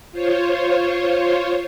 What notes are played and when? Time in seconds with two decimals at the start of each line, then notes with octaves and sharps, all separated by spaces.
0.12 F4 C5 C#5